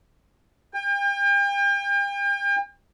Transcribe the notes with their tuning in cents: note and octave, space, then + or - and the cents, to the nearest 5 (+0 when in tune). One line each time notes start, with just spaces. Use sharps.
G5 +40